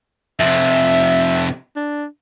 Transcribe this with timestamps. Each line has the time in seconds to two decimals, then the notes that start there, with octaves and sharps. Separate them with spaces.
0.40 F2 C3 E5
1.76 D4